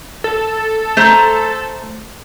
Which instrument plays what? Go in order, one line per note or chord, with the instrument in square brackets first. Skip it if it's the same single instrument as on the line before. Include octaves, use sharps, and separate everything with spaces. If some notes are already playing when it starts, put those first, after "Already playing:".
[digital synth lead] A4
[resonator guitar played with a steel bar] A3 C5 A#5